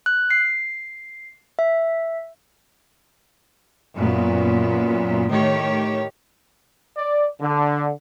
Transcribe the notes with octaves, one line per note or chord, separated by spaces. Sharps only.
F#6
C7
E5
F#2 A#2 B3
A2 D#3 G4 C#5
D5
D3